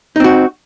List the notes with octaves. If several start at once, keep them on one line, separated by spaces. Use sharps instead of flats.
C4 D#4 F#4